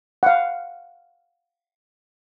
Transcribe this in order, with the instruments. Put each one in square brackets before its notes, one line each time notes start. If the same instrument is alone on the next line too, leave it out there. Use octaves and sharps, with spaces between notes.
[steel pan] F5 F#5